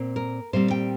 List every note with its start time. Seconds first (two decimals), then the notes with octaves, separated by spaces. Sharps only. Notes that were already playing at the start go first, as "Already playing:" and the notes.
Already playing: A#2 C4
0.16 A#4
0.53 A#2 G3 C4 C5
0.71 G5